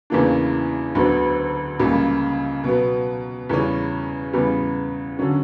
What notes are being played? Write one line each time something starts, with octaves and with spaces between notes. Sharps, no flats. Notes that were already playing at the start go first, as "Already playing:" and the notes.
E2 C#3 E3 A#3 D4
D2 D3 F#3 B3
C#2 C#3 G3 A#3
B2 F#3 B3
E2 C#3 G3 C#4
E2 C#3 G3 B3
D3 F#3 C#4